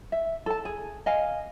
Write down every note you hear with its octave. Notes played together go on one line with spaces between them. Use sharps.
E5
A4 A5
G#4
D#5 F5 G#5